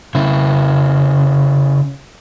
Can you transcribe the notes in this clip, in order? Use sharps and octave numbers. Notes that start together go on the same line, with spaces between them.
C#3 E4